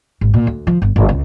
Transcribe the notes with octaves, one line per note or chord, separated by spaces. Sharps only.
G#1
A#2
D2
F3
G1
G1
C#2